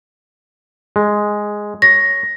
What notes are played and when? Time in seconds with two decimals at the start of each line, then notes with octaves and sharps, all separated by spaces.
0.96 G#3
1.82 C#5 A#6